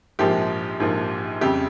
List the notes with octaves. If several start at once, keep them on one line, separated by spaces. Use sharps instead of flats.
A#1 G#2 F3 A#3 G4
A#1 G#2 F3 A#3
F2 C#3 G3 G4